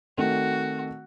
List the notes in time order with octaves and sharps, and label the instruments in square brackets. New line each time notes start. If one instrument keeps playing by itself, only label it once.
[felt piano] D#3 A3 C4 [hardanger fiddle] F#4